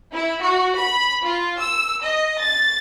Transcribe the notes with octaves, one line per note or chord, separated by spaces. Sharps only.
E4
F#4
B5
F4
E6
D#5
A6